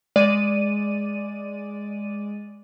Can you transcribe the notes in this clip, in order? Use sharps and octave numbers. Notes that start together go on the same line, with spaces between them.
G#3 D5 D#7